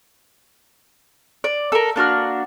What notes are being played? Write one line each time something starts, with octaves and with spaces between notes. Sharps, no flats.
D5
A4 A#4
A#3 D4 F#4 F6